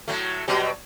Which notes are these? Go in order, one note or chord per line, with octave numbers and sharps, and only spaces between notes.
A2 F#3 A3
B2 F#3 G3